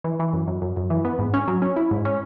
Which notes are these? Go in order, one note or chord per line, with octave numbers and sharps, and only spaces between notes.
E3
E3
F#2
F#2
F#2
F#2
E3
B3
G#2
C#4
F#3
C#4
E4
G#2
C#4